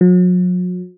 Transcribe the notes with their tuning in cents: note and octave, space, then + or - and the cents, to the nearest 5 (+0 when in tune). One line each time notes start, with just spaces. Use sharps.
F#3 -40